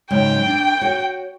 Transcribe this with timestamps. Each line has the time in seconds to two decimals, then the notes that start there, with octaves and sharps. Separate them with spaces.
0.10 G#2 C#3 F#3 G5
0.46 D4
0.81 F#4 C#5